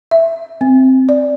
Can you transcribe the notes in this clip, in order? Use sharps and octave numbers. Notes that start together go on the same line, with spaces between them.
E5
C4
D5